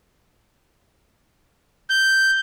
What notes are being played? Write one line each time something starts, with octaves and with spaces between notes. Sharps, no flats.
G6